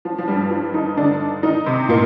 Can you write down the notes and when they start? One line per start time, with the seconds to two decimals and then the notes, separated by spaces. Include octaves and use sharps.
0.05 F3
0.18 F3
0.28 G2 G3
0.51 F3
0.74 D#3 D#4
0.97 D3 D4
1.43 D#3 D#4
1.66 C3 C4
1.89 A#2 A#3